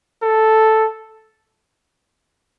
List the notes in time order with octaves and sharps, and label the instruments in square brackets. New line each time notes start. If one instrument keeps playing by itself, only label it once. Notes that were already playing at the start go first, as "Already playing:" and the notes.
[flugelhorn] A4